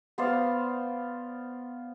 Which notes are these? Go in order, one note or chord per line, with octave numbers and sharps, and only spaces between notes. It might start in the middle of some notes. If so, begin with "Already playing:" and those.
B3 C5 D5 F5